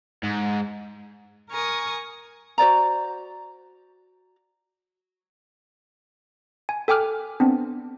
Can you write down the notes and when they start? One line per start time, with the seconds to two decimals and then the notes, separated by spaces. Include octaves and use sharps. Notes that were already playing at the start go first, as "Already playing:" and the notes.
0.23 G#2
1.50 A#4 G#5 C#6 D#6
2.58 F#4 C5 D5 A#5
6.69 G#5
6.88 A4 G5 G#5 D6 F6 F#6
7.40 B3 C4 D4